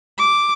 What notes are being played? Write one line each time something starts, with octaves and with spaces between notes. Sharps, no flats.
D6